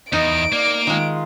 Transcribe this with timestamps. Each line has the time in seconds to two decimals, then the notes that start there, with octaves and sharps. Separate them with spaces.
0.13 E2 D#4 D#5 D7
0.53 A#3 D5
0.87 D#3 G#3 F4